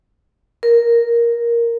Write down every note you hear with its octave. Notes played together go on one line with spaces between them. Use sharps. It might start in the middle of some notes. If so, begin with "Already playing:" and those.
A#4